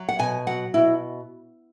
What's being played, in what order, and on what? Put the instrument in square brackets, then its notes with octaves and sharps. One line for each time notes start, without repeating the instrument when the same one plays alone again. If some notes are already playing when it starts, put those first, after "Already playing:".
Already playing: [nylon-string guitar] F#3
F#5
B2 G#5
F#3 F#5
B2 E4